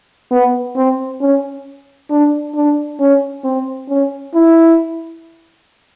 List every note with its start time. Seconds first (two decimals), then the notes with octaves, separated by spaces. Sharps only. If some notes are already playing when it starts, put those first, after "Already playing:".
0.31 B3
0.76 C4
1.21 C#4
2.10 D4
2.55 D4
3.00 C#4
3.44 C4
3.89 C#4
4.34 E4